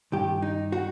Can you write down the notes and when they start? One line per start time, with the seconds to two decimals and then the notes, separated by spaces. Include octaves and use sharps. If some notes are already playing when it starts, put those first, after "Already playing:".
0.12 G2 D#3 G4
0.42 D#4
0.72 F#4